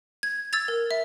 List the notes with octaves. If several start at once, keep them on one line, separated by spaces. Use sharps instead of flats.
G#6
E6 G#6 A6 F7
A#4
E5